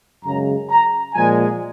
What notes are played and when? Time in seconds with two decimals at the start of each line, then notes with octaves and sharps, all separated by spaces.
0.23 F#2 C#3 G#3 A#5
0.70 A#5
1.14 A#2 F3 G#3 G#5